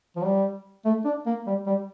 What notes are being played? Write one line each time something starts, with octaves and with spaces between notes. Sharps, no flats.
F3
G3
A3
D4
A#3
G3
G3